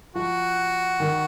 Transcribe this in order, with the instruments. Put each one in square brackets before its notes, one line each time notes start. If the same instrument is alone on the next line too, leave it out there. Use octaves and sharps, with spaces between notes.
[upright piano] F3 [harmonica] F#4
[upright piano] D#3